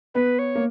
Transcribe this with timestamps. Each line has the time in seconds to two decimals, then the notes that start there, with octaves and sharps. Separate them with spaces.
0.15 B3 B4
0.39 C#5
0.55 A#3